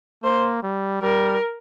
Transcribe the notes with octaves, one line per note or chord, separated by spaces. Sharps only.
A#3 C5
G3
G3 A#4